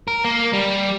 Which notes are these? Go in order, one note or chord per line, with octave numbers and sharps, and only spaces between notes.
A#4
A#3
G3